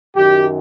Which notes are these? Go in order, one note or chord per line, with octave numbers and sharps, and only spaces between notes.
F#2 D#3 F#3 G4